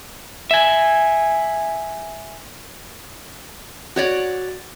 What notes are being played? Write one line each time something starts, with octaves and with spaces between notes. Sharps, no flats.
E5 G#5
F#4 C#5 D5